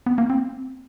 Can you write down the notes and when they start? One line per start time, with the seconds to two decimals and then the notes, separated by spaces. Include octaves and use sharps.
0.06 B3
0.18 A#3
0.30 C4